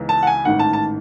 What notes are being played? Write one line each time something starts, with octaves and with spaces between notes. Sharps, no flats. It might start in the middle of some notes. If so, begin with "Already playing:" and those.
Already playing: C#2 C#3 E3 B3 D#4
A5
F#5
G#5
A1 G#2 D#3 F#5
A5
A5